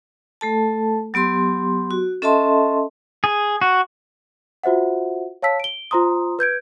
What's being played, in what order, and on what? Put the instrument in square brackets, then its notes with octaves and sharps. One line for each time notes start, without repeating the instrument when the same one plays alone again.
[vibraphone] A3 A4 A5
F#3 B3 G4 C6
F#4
C#4 A4 D#5 E5 A5 C6
[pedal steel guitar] G#4
F#4
[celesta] F4 F#4 C5 E5 F#5
C#5 F5 A5 E6 B6
D7 G7
F4 C5 A#5 C6 D#6
B4 G6 G#6 D7